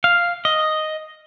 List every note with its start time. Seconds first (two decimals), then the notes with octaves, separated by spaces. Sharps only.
0.04 F5
0.45 D#5